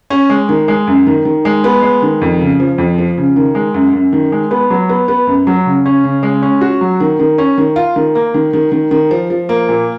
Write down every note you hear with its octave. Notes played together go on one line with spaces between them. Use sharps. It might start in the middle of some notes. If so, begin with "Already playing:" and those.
C#4
G#3
D#3
G#3
F#2
D#3
D#3
G#3
B3
G#3
D#3
F2
C#3
F3
F2
F3
C#3
D#3
G#3
F#2
F#2
D#3
G#3
B3
F#3
B3
B3
F#2
F#3
C#3
C#4
C#3
G#3
C#4
F#4
F#3
D#3
D#3
C#4
D#3
F4
D#3
A#3
D#3
D#3
D#3
D#3
F3
F3
A#3
A#2